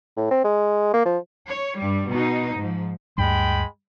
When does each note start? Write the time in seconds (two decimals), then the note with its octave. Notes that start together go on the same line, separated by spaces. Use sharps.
0.17 A2
0.31 C4
0.44 G#3
0.94 A#3
1.05 F3
1.47 C#5
1.78 G2 G3
2.10 B2 D#4
2.59 G#2 F3
3.18 D2 G2 G3 G#3 G5 B5